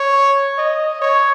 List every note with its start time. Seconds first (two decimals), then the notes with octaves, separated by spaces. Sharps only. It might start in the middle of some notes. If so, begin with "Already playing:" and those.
Already playing: C#5
0.58 D#5
1.01 C#5